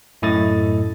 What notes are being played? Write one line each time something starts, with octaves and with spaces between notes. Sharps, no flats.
F#2 A2 E4 A4 D#5 A6